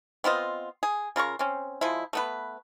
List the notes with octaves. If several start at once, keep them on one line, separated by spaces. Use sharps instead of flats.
B3 C4 F4 D#5
G#4
C#3 F4 A#4 C#6
C4 C#4
F3 G#3 E4
A3 B3 B4